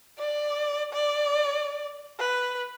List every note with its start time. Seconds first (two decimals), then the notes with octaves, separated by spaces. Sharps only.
0.19 D5
0.93 D5
2.19 B4